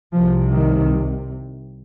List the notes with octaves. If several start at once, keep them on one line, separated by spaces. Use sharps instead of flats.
C2 C3 F3
D#3